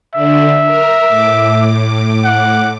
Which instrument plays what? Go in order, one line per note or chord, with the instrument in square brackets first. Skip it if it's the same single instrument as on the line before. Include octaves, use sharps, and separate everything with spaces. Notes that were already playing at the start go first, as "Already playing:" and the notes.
[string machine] D3 D4 [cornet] E5
[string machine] A#4
A2 D6
[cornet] F#5